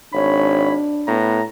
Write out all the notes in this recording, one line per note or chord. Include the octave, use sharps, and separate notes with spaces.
G#1 D4 C#5 B5
A2 B3 A#5